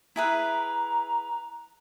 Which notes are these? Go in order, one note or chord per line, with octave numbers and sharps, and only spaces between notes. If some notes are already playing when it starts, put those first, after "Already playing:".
E4 G#4 B4 A#5